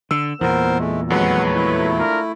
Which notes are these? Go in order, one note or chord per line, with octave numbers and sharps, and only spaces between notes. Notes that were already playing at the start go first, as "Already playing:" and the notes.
D3 E6
E2 A#2 B3 A#4 C5
G#3 A3
F2 F#3 G#3 B4 C#5 F#5
A3 E4
D4 F4 A#4